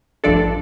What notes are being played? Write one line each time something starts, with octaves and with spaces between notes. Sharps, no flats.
A1 G2 F3 D4 A4 D5